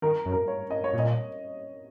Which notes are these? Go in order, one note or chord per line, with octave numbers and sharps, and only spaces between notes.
D#3 A#4
F#2
A#4
C#5
D#5
C#5
A#2
D#5